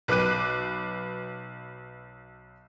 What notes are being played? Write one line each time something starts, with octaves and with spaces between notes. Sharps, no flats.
B1 B4 D6 F#6 D#7